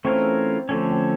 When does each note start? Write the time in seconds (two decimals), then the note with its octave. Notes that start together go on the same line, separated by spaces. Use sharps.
0.04 E3 A3 C4 C#4 F4 A#4
0.69 D3 F3 A3 C4 C#4
0.90 C4